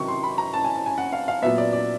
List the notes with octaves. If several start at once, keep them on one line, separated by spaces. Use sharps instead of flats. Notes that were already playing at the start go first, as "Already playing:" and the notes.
Already playing: C3 D#3 F#3 C#6
C6
B5
A#5
A5
G#5
A5
G#5
F#5
F5
F5
A#2 F#3 B3 E5
D5
D5